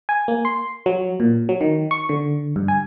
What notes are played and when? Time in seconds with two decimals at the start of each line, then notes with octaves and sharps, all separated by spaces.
0.09 G#5
0.28 A#3
0.45 C6
0.86 F#3
1.20 A#2
1.49 F#3
1.61 D#3
1.91 C#6
2.09 D3
2.56 G2
2.68 G#5